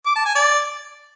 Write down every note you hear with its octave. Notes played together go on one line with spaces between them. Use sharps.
D6
A5
G#5
D5